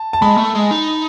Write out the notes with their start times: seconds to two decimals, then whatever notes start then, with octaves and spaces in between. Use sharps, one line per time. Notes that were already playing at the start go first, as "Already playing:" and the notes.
Already playing: A5
0.13 A5
0.22 G#3 B5
0.37 A3
0.55 G#3
0.71 D#4